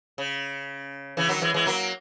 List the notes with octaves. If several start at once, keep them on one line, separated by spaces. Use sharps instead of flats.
C#3
C#3 E3
D#3 F#3
E3 G#3
E3 G#3
F#3 A#3